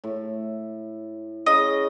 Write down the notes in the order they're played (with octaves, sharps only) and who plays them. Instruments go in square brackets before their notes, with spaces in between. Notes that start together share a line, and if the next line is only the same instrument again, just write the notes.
[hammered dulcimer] A2
[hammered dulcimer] C#3 [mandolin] D#5